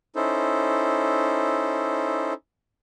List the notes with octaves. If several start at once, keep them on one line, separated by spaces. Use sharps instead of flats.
C#4 D#4 E4 A4 C5